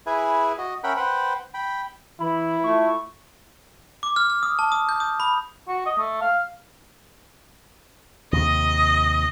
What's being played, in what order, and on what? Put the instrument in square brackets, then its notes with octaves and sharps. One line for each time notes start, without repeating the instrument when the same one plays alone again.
[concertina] E4 G#4 B4 E5 G#5
F#4 D#5
C#4 A#4 E5 F#5 G5 B5
B4 C5 F#5 G5
G5 B5
[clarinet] E3 [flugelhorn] E4 [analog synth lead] B5
[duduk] A3 [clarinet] F4 [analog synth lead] C#6
[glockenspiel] D6
F6
F6
D#6
A5
D#6
G6
D#6
B5
[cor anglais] F#4
D#5
A3
F5
[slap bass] D#2 C3 [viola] D#5